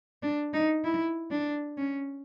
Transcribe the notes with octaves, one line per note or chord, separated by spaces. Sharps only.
D4
D#4
E4
D4
C#4